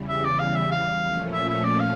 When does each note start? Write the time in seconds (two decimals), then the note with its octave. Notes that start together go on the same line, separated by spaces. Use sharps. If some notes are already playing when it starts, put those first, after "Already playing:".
Already playing: E2 C#3 E3 G3
0.09 E5
0.25 D5
0.39 F5
0.55 E5
0.71 F5
1.02 A#2 F3 A3 C#4
1.33 E5
1.49 E5
1.64 D5
1.80 F5